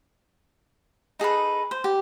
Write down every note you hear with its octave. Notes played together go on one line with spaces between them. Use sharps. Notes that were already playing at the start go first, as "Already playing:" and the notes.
D#4 G#4 A4 B4
C5
G4